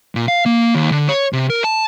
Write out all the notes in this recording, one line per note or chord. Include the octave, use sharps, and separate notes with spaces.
A#2
F5
A#3
D#2
D3
C#5
C3
A#4
A5